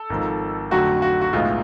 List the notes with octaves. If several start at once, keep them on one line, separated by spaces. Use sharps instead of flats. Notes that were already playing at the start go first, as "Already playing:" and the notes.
Already playing: A4
G#1 G#2 F3
F2 D3 F#3 A3 F#4
F#4
F#4
B1 A2 G#3 B3 F4